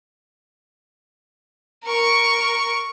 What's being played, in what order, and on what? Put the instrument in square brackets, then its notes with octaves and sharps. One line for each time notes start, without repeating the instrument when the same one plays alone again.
[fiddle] A#4 C#6